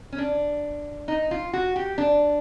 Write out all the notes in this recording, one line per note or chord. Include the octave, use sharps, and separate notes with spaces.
C#4
D4
D#4
F4
F#4
G4
D4